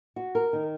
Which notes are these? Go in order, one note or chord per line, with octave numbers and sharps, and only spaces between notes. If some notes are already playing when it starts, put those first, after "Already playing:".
F#4
A#4
D#3